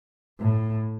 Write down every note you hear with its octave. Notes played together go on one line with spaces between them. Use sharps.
A2